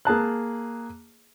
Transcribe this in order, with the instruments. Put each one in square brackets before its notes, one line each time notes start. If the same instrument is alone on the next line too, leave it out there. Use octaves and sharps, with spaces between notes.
[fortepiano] A#3 G#4 A5 F#6